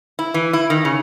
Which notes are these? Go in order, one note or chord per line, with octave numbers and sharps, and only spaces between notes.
E4
E3
E4
D#3
C#3